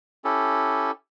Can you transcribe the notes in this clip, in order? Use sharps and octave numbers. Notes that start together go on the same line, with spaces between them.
C#4 E4 G4 A4